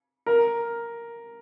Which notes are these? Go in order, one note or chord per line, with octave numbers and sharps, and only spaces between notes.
A#4